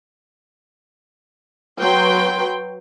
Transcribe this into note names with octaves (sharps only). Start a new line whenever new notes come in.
F#3 B4 G5 C6